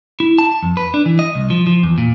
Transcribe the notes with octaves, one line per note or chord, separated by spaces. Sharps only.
E4
A5
F2
B4
D4
E3
D#5
C2
F3
F3
E2
A#2